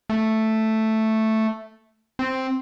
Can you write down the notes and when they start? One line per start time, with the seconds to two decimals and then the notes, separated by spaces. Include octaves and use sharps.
0.10 A3
2.19 C4